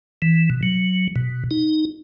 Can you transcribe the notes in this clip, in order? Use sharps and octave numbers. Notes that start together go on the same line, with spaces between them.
E3
B2
F#3
B2
D#4